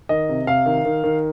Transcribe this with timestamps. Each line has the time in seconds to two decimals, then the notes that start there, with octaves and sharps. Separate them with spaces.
0.09 D#3 D#5
0.29 C3
0.47 C3 F5
0.66 D#3
0.85 D#3
1.04 D#3